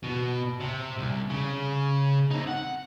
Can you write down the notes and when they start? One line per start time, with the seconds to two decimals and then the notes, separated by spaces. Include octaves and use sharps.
0.03 B2
0.60 C3
0.98 C2
1.30 C#3
2.31 C4 D#4
2.48 F#5